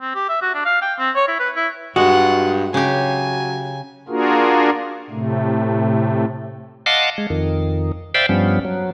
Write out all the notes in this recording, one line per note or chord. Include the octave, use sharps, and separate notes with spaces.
C4
G4
E5
F#4
D4
F5
G5
C4
C#5
E4
B4
E4
G2 G#3 F4 F#4 F#5
C#3 F#3 G4 G#5
A#3 D4 F4 F#4 G#4 A#4
A2 C3 A3
D#5 F5 F#5 A5 C6 D6
G#3
F2 D#3
C5 D5 E5 F5 G5 B5
G2 F3 G3 B3 C#4
F#3